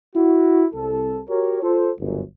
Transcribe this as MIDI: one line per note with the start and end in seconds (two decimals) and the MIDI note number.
0.16 0.64 64
0.16 0.64 66
0.74 1.21 36
0.74 1.21 69
1.28 1.59 66
1.28 1.59 67
1.28 1.59 70
1.28 1.59 73
1.62 1.90 65
1.62 1.90 69
1.62 1.90 72
1.99 2.21 31
1.99 2.21 37
1.99 2.21 42